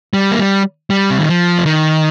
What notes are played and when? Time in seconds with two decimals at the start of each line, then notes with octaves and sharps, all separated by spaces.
0.14 G3
0.32 A#3
0.39 G3
0.90 G3
1.11 C3
1.19 D#3
1.29 F3
1.58 C3
1.66 D#3